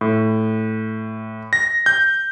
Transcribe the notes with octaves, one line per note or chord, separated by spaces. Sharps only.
A2
A#6
G6